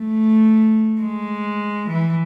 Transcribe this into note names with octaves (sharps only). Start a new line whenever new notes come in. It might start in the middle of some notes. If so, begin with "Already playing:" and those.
Already playing: A3
G#3
E3